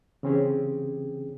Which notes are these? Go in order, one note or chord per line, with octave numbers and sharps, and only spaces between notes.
C#3 E3 C4 C#4 G4 G#4